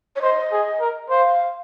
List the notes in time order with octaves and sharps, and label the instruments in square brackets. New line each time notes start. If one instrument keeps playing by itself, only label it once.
[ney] C#5
[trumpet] C5 [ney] D#5
[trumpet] G#4
A#4
[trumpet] C5 [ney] F5